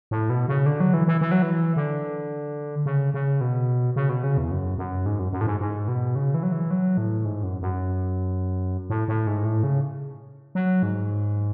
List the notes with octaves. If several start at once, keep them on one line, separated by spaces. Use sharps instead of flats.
A2
B2
C#3
D3
F#3
E3
E3
E3
F#3
E3
D3
C#3
C#3
B2
C#3
B2
C#3
E2
F#2
F#2
G#2
F#2
F#2
A2
G#2
G#2
B2
C#3
E3
F#3
E3
F#3
A2
G#2
F#2
F#2
A2
A2
G#2
A2
C#3
F#3
G#2